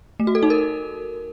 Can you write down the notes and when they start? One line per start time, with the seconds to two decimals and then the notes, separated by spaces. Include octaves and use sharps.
0.20 A3
0.27 F#4
0.35 A4
0.43 D#4
0.50 A#4